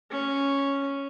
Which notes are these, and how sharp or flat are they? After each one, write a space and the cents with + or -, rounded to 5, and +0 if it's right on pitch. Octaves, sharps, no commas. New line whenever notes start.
C#4 +0